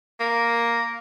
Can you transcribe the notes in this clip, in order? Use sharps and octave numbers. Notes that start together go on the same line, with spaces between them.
A#3